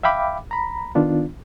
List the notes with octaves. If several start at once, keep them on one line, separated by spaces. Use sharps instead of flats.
E5 F5 G5 B5 D6
A#5 B5
D#3 B3 D4 F4